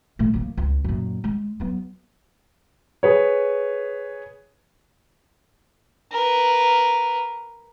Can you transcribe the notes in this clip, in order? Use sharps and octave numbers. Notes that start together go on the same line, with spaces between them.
A#2 A3
F3 A#3
C#2
F#2 A#2
G#3
F#3 B3
G#4 B4 C#5
A#4 B4